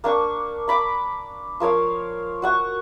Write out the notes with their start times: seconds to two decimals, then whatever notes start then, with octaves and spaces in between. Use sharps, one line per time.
0.04 A#3 D4 C#6
0.68 A#5 B5 D6
1.60 F3 A#4 C#5 F5
2.42 F#4 F#5 C#6